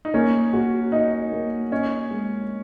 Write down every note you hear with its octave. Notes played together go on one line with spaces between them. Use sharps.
D#4
A#3 C#4
F#4
D#4 D#5
A#3
C#4 D#5
G#3